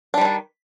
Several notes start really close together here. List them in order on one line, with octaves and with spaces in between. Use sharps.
D4 G3 F3 D#3